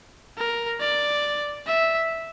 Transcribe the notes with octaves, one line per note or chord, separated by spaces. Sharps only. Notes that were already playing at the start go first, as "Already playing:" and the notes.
A#4
D5
E5